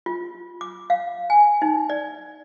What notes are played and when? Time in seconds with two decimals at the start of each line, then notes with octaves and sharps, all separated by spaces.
0.06 F4
0.61 D6
0.90 F5
1.30 G#5
1.62 D#4
1.90 D5